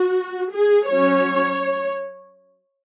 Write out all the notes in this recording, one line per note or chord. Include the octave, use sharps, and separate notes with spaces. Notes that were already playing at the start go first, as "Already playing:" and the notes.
Already playing: F#4
G#4
F#3 C#4 C#5